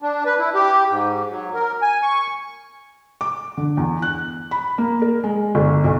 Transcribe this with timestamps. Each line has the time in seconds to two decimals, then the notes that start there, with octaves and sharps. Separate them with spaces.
0.02 D4
0.26 B4
0.39 E4
0.54 G4
0.90 G#2
1.30 F#3
1.54 A#4
1.82 G#5
2.03 C#6
3.21 D6
3.57 D3
3.77 E2
4.02 F#6
4.51 B5
4.78 A#3
5.02 A#4
5.24 G#3
5.55 G1
5.84 B1